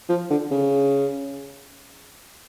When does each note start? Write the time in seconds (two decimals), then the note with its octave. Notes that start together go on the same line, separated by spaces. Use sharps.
0.09 F3
0.30 D3
0.51 C#3